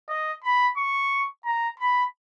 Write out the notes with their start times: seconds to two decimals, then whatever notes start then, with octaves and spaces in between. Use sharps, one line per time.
0.09 D#5
0.43 B5
0.77 C#6
1.45 A#5
1.79 B5